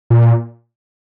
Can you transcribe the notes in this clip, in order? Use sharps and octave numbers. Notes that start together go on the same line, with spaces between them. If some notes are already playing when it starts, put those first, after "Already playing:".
A#2